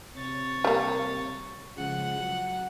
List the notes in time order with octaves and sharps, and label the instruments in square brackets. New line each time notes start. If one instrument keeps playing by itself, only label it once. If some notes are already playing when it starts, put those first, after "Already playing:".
[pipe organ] C3 A6 [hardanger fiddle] C#5
[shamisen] G3 A#3
[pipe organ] C#3 F3 G#3 [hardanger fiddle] F#5
[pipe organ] F#3